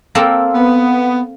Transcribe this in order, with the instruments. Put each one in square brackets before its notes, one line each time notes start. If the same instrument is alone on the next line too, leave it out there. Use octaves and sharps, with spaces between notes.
[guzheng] A#3 C4 A4
[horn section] B3